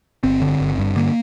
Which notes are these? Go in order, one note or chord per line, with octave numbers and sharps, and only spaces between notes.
G1 C4
D3
G1
G2
D3 A#3